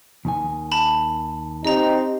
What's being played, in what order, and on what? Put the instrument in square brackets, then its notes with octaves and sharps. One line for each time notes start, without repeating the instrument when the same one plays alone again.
[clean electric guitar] D#2 D#3 G#5
[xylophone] A5 B5
[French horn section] C4 G4 [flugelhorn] D#4 [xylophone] D#5 A#5